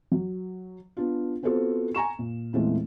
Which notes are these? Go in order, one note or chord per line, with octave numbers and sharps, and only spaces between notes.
F#3
B3 D4 F4
B3 C4 F4 F#4 A4 C5
G#5 A#5 C#6 E7
A#2
E2 A#2 E3 G#3 A3 C4